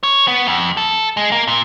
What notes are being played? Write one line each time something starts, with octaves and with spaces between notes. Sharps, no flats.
C#5
B3
F2
A4
G#3
A#3
A#2